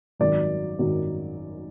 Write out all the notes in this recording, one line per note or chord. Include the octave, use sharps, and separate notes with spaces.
G#1 F#2 D#3 F#3 D5
G#1 F#2 D#3 F#3